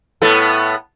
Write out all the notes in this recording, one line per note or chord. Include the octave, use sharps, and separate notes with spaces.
A2 B3 A4